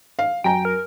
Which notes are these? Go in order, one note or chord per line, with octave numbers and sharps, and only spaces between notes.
F5
F#2 G5 G#5 A#5
A#4